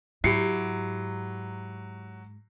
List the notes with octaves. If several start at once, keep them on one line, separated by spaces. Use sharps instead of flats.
G#2 F#3 E4 G4 C7 C#7